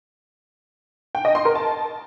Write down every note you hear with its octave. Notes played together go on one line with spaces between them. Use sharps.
G5
D#5
C6
A#4
A5